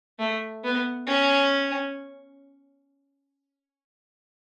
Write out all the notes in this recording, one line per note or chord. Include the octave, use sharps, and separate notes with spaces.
A3
B3
C#4